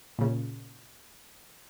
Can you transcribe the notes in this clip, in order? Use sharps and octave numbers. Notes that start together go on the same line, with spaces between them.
A#2 C#3